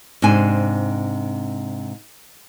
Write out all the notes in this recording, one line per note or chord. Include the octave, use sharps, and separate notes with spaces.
G#2 C3 D4 C5 G#5